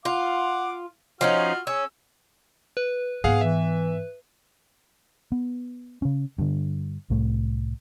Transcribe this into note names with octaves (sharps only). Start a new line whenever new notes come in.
F4 F5 F#5 D6
F3 C#4 D#4 F4 F#4 F6
C#4 G#4 E6
B4
G#2 B3 G#4 F5 F#5
E3 E5
B3
C#3 C#4
G2 D3
C2 A2 A3